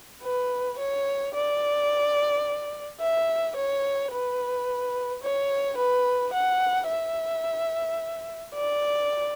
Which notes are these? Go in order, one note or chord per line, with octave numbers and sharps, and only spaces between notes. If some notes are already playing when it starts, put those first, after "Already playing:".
B4
C#5
D5
E5
C#5
B4
C#5
B4
F#5
E5
D5